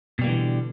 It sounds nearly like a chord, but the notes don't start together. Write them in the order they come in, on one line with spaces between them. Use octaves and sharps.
B2 G3 A#3 E3 D3